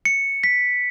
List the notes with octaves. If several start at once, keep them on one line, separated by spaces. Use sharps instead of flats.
C#7
B6